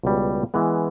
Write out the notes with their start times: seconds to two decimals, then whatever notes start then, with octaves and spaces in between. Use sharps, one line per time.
0.03 C#2 B2 G3
0.54 E3 G#3 B3